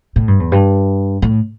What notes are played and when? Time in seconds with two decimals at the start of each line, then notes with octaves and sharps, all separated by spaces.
0.16 A2
0.28 G2
0.40 E2
0.52 G2
1.22 A2